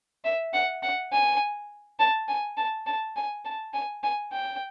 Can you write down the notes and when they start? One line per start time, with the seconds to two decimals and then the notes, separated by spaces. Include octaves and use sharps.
0.25 E5
0.54 F#5
0.83 F#5
1.12 G#5
2.00 A5
2.28 G#5
2.57 A5
2.86 A5
3.17 G#5
3.45 A5
3.74 G#5
4.04 G#5
4.33 G5